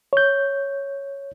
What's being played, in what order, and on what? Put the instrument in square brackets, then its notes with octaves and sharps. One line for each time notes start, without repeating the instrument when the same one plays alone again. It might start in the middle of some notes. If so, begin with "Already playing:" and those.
[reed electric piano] C#5 G6